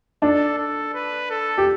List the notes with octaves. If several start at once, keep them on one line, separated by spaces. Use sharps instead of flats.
D4 A4
A4
B4
A4
G4